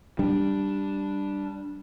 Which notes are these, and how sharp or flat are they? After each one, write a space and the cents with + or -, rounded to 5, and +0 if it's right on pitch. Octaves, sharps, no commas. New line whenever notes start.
G3 +0 D4 +0